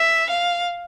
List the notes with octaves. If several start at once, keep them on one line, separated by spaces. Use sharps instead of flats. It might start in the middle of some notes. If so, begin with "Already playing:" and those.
Already playing: E5
F5